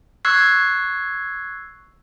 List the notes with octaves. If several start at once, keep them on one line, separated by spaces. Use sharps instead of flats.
C#6 E6 F#6 G#6 C7